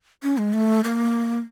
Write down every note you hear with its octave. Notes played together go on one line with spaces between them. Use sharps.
C#4
G#3
A3
A#3